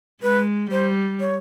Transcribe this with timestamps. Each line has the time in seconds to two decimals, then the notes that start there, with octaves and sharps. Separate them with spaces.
0.22 G#3 B4
0.71 G3 C5
1.20 C#5